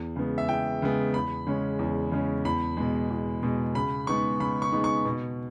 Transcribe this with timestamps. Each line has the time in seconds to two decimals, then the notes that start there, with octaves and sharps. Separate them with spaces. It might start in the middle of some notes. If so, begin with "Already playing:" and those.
Already playing: E2
0.16 C#3 G#3 B3
0.38 E5
0.48 E2 G5
0.82 C#3 G#3 B3
1.14 E2 B5
1.47 C#3 G#3 C#4
1.79 E2
2.11 C#3 G#3 C#4
2.45 E2 B5
2.77 B2 G#3
3.10 E2
3.43 B2 G#3
3.75 C#3 B5
4.07 G#3 B3 D#4 C#6
4.40 C#3 B5
4.62 C#6
4.72 G#3 B3 D#4
4.84 C#6
5.05 B2